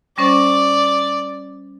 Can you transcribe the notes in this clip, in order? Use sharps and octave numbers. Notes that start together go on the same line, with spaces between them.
G3 C#4 C5 D5